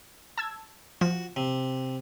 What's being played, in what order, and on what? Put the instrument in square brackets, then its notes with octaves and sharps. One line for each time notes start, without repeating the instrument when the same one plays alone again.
[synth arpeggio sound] A5 E6 G#6
[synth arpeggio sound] F3 [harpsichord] F#4
[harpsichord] C3